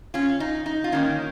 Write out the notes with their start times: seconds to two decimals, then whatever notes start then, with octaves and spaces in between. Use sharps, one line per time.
0.14 C#4 F4
0.40 D#4
0.66 D#4
0.84 F4
0.92 D#3 A#3 C#4 D#4